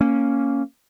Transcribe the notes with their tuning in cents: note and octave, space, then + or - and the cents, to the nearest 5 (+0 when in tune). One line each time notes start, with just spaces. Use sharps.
A#3 -5 C#4 +0